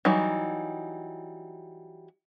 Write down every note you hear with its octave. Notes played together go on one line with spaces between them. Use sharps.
E3 F#3 G3 D#4